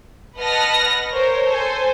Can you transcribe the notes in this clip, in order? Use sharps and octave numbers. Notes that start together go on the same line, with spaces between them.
B4 D#5 F#5 A5 F6 A#6
A#4 C5 C#5
A4 C5 G#5